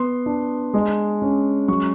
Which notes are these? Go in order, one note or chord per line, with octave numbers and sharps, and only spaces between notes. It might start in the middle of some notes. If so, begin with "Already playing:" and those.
Already playing: B3 C6
D4
G#3
C#4
F#3 C#6